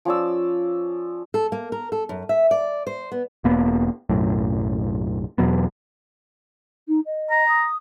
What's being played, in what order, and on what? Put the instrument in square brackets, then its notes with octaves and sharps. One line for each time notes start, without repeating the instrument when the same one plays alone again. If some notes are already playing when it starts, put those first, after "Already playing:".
[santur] F3 C#4 D5 E6
[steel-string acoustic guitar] A4
A#3
A#4
A4
F#2
E5
D5
C5
B3
[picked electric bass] E1 A#3 B3
B1 F#2 A2
E2 B2 F#3 B3
[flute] D#4
D#5
[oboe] A#5
[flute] D#6